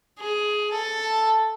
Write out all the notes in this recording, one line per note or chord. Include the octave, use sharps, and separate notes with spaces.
G#4
A4